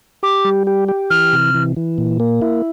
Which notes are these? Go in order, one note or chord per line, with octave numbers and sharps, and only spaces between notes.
G4 D6
G3
G4
G4
E3 F6
C3
E3
E3
A#2
A#3
E4